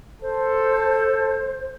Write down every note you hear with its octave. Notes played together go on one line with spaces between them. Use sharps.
A4 C5